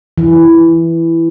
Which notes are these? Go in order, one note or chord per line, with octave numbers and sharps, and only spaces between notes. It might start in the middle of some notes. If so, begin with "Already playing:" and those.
E3